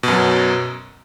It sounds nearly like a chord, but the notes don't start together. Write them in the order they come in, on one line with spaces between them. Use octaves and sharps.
B2 F#2 F#3